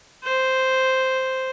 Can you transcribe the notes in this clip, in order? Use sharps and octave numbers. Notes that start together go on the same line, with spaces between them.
C5